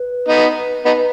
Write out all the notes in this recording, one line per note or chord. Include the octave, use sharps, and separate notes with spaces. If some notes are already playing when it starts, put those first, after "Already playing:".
Already playing: B4
B3 D#4
B3 D#4